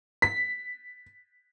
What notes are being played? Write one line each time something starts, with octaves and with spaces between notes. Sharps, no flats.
B6